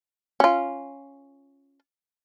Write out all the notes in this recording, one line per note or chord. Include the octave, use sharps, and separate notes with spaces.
C#4 F4